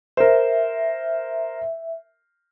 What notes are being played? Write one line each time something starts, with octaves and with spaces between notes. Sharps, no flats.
A#4 C5 E5